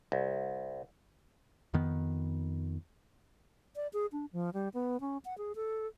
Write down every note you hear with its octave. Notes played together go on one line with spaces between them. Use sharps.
C2
F2 D#3 B3
D5
G#4
D4
F3
G3
B3
C#4
F#5
G#4
A4